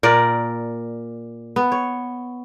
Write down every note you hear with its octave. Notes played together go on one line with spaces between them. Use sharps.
A#2 A#4 D5
B3
C#5